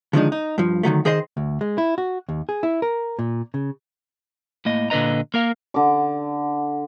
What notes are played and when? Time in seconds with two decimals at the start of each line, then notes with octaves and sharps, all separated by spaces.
0.13 D3 D#3 F3 G#3 D4 D#4
0.32 D#4
0.58 G2 F3
0.83 D3 D#3 F#3 A3
1.05 D#3 G#4 C5 D#5 C6
1.37 D2
1.61 G#3
1.78 E4
1.98 F#4
2.29 D#2
2.49 G#4
2.63 E4
2.82 A#4
3.19 A#2
3.54 C#3
4.65 A2 A#3 D#5
4.90 A#2 D3 B4 D#5 A#5
5.34 A#3 A#4 F5
5.74 D3 D6